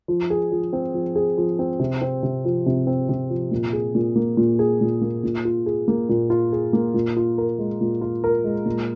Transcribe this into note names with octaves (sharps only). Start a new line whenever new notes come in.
F3
G#4
F3
C4
F3
G#4
F3
C4
C3
C4
C3
F3
C3
C4
C3
F3
A#2
G#4
A#2
A#3
A#2
G#4
A#2
A#3
A#2
F4
G#4
A#3
A#2
F4
G#4
A#3
A#2
F4
A#4
G#3
A#2
F4
A#4
G#3
A#2